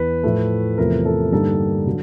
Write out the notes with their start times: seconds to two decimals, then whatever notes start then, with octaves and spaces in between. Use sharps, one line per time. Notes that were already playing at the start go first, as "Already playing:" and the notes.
Already playing: E2 B4
0.23 A2 F3 A3
0.78 E2 C3 F3 A3 A#4
1.05 A4
1.32 G2 D3 G3 A#3 D#4 A4
1.87 D3 F#3